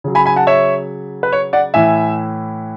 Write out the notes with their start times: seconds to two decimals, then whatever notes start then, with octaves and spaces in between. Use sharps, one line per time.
0.04 C#3 F#3
0.15 G#5 B5
0.26 G#5 B5
0.36 F#5 A5
0.47 C#5 E5
1.23 B4
1.33 C#5
1.53 D5 F#5
1.74 A2 E3 E5 G#5